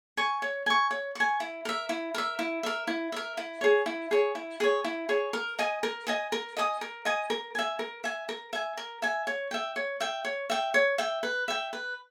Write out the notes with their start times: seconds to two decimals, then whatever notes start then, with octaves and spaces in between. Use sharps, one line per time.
0.17 G#5 C#6
0.42 C#5
0.66 G#5 C#6
0.91 C#5
1.15 G#5 C#6
1.40 E4
1.65 A#4 E5
1.89 E4
2.14 A#4 E5
2.39 E4
2.63 A#4 E5
2.87 E4
3.12 A#4 E5
3.37 E4
3.61 G#4 C#5
3.86 E4
4.11 G#4 C#5
4.35 E4
4.60 G#4 C#5
4.84 E4
5.09 G#4 C#5
5.33 A#4
5.59 D#5 G#5 D#6
5.83 A#4
6.07 D#5 G#5 D#6
6.32 A#4
6.57 D#5 G#5 D#6
6.81 A#4
7.05 D#5 G#5 D#6
7.30 A#4
7.55 E5 G#5
7.79 A#4
8.04 E5 G#5
8.29 A#4
8.53 E5 G#5
8.77 A#4
9.02 E5 G#5
9.27 C#5
9.51 E5 G5
9.76 C#5
10.00 E5 G5
10.25 C#5
10.50 E5 G5
10.74 C#5
10.98 E5 G5
11.23 B4
11.48 E5 G5
11.73 B4